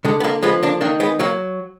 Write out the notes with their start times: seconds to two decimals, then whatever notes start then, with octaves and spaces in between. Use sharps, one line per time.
0.05 D3 G#3
0.20 B3
0.24 A#3
0.42 F3 G#3 B3
0.63 A#3 D4
0.81 D#3 A#3 D4
1.00 G#3 B3
1.19 F#3 A#3